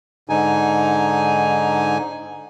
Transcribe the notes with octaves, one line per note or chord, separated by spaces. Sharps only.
G#2 D3 D#4 G#5